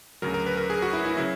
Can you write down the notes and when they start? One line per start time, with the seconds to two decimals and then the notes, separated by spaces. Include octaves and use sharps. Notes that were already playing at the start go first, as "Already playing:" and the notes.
0.22 D2 C#3 F#3 A#4
0.34 A#4
0.46 B4
0.57 A#4
0.70 G#4
0.82 F#4
0.93 E4
1.05 E4
1.17 C#3 F#3 E4